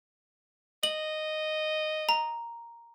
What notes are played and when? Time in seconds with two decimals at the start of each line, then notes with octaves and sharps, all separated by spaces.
0.83 D#5 F#7
2.09 A#5